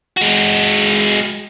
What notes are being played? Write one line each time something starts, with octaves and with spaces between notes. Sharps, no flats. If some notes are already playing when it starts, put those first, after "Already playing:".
G#3 F#4